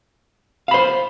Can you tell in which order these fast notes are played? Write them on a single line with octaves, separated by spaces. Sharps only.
F5 B5 C5